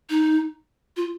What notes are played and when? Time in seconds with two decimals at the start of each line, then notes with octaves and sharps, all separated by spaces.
0.10 D#4
0.97 F4